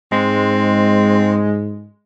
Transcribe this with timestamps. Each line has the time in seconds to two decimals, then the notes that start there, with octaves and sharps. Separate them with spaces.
0.12 G#2 G#3 C4